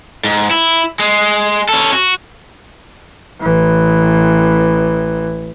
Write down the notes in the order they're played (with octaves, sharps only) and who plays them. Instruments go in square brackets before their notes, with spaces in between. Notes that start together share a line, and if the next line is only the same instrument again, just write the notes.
[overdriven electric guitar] G#2
E4
G#3
C#4 A4
F#4
[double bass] A1 E3